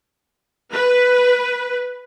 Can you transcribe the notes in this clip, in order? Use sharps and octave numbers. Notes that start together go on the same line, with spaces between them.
B4